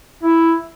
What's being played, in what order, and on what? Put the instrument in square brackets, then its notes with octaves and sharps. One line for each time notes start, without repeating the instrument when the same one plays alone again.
[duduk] E4